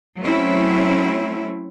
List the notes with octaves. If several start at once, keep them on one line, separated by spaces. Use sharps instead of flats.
F#3 A3 C4 C#4 E4